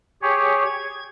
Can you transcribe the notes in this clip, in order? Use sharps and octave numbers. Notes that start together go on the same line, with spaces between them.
G4 G#4 C#5
G#6